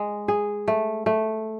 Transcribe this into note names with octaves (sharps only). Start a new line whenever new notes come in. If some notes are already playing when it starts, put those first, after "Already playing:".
Already playing: G#3
G#4
A3
A3